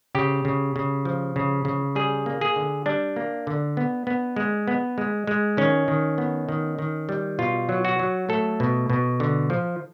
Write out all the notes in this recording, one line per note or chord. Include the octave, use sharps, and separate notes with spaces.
C#3 G4
C#3
C#3
F3
C#3
C#3
G3 G#4
A#3
G#4
D3
G3 D4
A#3
D3
B3
B3
G#3
B3
G#3
G#3
D#3 C#4
D#3
B3
D#3
D#3
G3
B2 F4
F#3
F#4
F#3
A3 A4
B2
B2
D3
F3